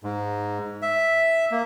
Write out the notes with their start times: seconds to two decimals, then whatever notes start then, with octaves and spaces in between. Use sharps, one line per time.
0.04 G#2
0.82 E5
1.52 A#3